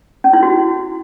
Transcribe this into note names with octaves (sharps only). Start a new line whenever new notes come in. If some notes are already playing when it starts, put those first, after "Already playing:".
C#4
E4
F#4